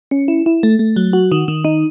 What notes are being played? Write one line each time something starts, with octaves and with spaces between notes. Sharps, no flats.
C#4
E4
E4
A3
A3
F#3
F#4
D#3
D#3
D#4